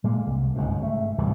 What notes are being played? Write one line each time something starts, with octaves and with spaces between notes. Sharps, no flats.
A#2 G#3 A#3
C2
G1 C#2 G#2 B2
G#2 A3
D1 C2 G#2 E3